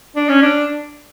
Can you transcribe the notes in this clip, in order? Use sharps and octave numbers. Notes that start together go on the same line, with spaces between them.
D4
C#4
D4